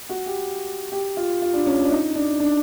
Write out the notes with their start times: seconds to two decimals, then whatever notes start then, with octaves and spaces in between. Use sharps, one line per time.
0.09 F#4
0.26 G4
0.92 G4
1.17 F4
1.42 F4
1.53 D4
1.66 C#4
1.85 D4
1.91 D#4
2.15 D4
2.40 D4